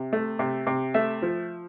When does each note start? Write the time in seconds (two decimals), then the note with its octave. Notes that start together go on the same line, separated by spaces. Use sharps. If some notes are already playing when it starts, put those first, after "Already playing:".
Already playing: C3
0.13 A3
0.39 C3
0.67 C3
0.94 A3 E5
1.22 F3